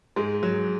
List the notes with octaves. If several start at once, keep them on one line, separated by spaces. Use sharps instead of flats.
G#2 G#3
F#3